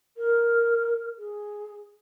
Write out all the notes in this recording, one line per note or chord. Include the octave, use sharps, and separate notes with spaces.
A#4
G#4